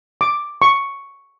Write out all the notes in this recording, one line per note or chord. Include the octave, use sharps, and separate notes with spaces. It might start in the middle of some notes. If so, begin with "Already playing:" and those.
D6
C#6